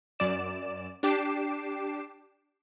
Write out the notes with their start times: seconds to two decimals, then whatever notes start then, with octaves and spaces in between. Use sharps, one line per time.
0.19 F#2 D5 E7
1.03 D4 G4 D6 C7 E7